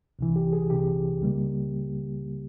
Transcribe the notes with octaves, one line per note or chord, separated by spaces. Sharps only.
C2 C3 E3
G4
G#4
C2 C3 E3 G4
C#2 C#3 G3 A#3